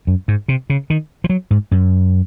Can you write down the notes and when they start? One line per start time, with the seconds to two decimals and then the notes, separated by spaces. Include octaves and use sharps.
0.07 F#2
0.28 G#2
0.48 C3
0.70 C#3
0.90 D#3
1.24 F3
1.29 F#3
1.51 G#2
1.71 F#2